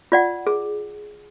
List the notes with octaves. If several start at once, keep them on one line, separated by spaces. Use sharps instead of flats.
F4 D5 F#5
G#4